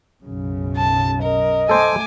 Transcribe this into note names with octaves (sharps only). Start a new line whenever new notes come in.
B1 F#2 C#3
A5
A#4 D#5
A3 A4 C5 G#5 D6